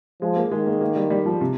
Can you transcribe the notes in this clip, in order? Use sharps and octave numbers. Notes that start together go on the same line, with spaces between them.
F3 G#3
A#3
D#3 G#3
A#3
A#3
G3
G3
F3
C3